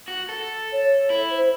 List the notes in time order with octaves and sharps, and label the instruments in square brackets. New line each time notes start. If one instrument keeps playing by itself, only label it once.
[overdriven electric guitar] F#4
A4
[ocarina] C#5
[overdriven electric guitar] E4
[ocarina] C5